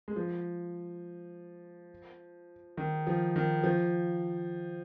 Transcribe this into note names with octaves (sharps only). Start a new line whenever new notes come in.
G#3
F3
D#3
F3
D#3
F3